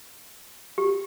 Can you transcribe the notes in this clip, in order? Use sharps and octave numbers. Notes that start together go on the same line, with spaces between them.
G4